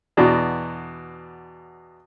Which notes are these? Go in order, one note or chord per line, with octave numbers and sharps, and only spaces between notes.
E2 B2 D4